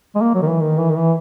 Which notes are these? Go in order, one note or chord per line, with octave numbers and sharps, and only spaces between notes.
G#3
A#3
F#3
D#3
E3
D#3
E3
D#3
E3